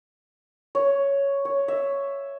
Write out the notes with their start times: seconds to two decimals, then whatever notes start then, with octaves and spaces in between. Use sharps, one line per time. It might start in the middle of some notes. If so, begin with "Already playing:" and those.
0.75 C#5
1.45 C#5
1.68 E5